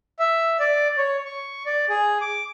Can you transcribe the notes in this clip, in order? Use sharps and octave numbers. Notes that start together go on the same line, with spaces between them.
E5
D5
C#5
C#6
D5
G#4
D6